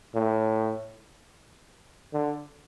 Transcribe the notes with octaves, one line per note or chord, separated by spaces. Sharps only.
A2
D3